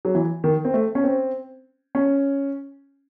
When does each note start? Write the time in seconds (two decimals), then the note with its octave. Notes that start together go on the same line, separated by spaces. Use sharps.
0.05 F#3
0.15 E3
0.44 D#3
0.65 C4
0.74 A3
0.95 C#4
1.04 C4
1.95 C#4